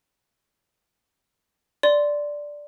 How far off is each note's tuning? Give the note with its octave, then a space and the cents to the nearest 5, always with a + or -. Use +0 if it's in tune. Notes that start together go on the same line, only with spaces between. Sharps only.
D5 +0 C6 -10